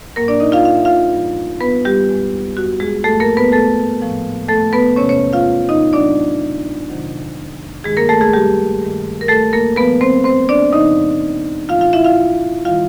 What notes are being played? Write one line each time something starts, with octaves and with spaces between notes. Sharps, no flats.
A2 F#3 A#3 A#4
D4 D5
D#4 D#5
F4 F5
F5
E5
F4 F5
G2 E3 G3
B3 B4
G3 G4
E2 B2 G#3
F#4
G#3 G#4
G#2 F3 G#3 A3 A4
A#3 A#4
B3 B4
A3 A4
A2 F3 G#3
A3 A4
B3 B4
E2 C3 E3 G#3 C#4 C#5
C#4 C#5
F4 F5
D#4 D#5
A2 F#3 D4 D5
F2 C3 D#3 F#3
G2 D#3 G3 G#3 G#4
A#3 A#4
A3 A4
G#3 G#4
G3 G4
G2 D#3 G#3
A#4
A3 A4
A#3 A#4
A#2 F3 G#3 B3 B4
C4 C5
C4 C5
D4 D5
F#2 C#3 F3 D#4 D#5
A2 E3 G#3 F4 F5
F4 F5
E4 E5
F4 F5
D#3 G3 F4 F5